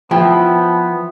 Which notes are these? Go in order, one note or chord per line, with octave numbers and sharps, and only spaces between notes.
F3 B3 E4 G5 B5